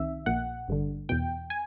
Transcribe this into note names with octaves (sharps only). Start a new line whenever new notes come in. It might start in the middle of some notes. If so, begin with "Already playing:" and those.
Already playing: C2 C3 D#3 E5
A#1 A#2 F#5
G#1 G2 D3
E2 B2 G5
G#5